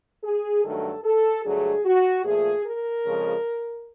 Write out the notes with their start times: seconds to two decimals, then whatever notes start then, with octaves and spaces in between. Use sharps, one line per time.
0.23 G#4
0.64 G2 D#3 F#3 A3 A4
1.04 A4
1.44 G2 D3 F#3 A3 G#4
1.85 F#4
2.25 A#2 F3 A3 G#4
2.66 A#4
3.06 F2 C#3 F3 G#3